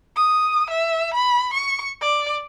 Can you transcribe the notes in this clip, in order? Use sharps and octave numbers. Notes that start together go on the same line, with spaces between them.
D#6
E5
B5
C#6
D5